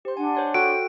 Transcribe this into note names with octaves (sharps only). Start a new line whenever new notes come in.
G4 C5 C6
D4 F#5 G#5
C5 C#5 C6
F#4 A4 G5 D7